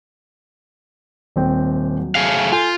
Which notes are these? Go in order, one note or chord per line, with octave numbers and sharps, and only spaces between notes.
D#1 C4 G5
F#3
A3 G#4 F5
F4 A4 G#5 G6